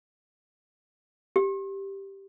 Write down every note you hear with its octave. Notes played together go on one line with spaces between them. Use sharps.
G4